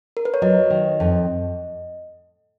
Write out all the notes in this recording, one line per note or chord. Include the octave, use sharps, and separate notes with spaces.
A#4
B4
C#5
F#3 D#5
D#3
F2